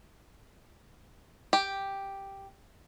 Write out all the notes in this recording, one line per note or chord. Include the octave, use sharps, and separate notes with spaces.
G4